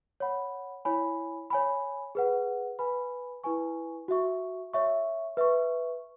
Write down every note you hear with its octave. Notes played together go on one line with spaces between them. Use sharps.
C#5 F#5 B5
E4 C#5 G#5 B5
C#5 G#5 B5
G#4 B4 F#5
B4 G#5 B5
E4 B4 G#5 C#6
F#4 E5 C#6
C#5 E5 C#6
B4 E5 C#6